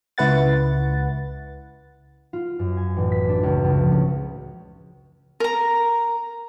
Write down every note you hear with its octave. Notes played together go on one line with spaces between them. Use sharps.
C#2 E4 B4 F#5 A6
F4
F#2
G#5
A1
B6
D4
C#2
C#2
F3
C#4
A#4 A#5